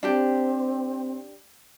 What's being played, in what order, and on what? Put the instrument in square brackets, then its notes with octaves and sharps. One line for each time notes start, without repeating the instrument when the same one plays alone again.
[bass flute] C4 [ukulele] D4 G4 G5